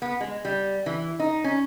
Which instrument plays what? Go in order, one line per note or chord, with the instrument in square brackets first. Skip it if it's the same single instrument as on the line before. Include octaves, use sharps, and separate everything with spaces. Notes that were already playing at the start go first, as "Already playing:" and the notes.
[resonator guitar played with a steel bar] B3
G#3
G3
E3
D#4
C#4